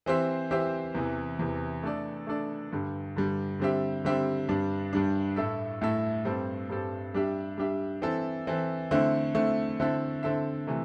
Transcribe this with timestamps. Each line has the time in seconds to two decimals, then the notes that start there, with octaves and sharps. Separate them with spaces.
0.06 E3 C4 G4 C5 E5
0.51 E3 C4 G4 C5 E5
0.95 E2 C3 E3
1.39 E2 C3 E3
1.83 A3 D4 A4 D5
2.27 A3 D4 A4 D5
2.72 G2 D3 G3
3.16 G2 D3 G3
3.60 D3 G3 C4 G4 E5
4.05 D3 G3 C4 G4 E5
4.48 G2 G3 D4
4.93 G2 G3 D4
5.36 A2 A3 E4 A4 E5
5.81 A2 A3 E4 A4 E5
6.25 G2 G3 C4 A4
6.69 G2 G3 C4 A4
7.14 G3 D4 G4 E5
7.58 G3 D4 G4 E5
8.02 E3 C4 E4 A4
8.47 E3 C4 E4 A4
8.91 D3 A3 C4 E4
9.35 D3 A3 C4 E4
9.80 D3 C4 E4 A4 E5
10.23 D3 C4 E4 A4 E5
10.67 C3 E3 A3